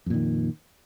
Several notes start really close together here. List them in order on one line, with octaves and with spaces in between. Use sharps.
F2 A#2 D#3